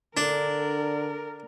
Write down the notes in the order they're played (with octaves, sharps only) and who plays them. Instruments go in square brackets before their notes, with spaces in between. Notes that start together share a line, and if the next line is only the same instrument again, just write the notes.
[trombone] D3 [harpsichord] D4 [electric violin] A#4